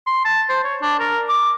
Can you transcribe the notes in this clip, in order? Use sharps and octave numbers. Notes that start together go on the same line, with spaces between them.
C6
A5
C5
C#5
D4
A#4
D6